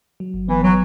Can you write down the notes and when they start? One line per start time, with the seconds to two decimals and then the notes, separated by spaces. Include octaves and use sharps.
0.20 F#3
0.34 G1
0.48 E3 B3
0.64 F#3